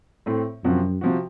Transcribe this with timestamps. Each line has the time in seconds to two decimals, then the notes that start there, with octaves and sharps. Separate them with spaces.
0.26 A2 A3 C4
0.64 F#2 C3 F3 C4 F#4
1.01 C3 F3 C4 F#4